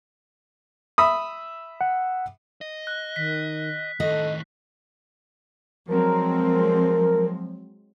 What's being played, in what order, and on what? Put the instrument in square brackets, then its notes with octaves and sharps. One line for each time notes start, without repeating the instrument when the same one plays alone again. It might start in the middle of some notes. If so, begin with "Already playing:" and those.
[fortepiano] E5 B5 D#6
[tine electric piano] F#5
[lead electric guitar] D#5
[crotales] F#6
[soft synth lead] D#3 [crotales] B6
[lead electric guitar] A2 D#3 [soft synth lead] A4 [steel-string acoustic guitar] D#5
[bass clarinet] F3 [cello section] F#3 G#3 C4 [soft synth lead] A#4